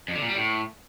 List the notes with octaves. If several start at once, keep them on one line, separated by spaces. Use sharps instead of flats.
F2
D3
A#2
G3
A2